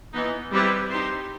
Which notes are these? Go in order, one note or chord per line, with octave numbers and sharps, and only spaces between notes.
E3 B3 D#4
G3 C4 E4 G4 B4
D#4 G4 C5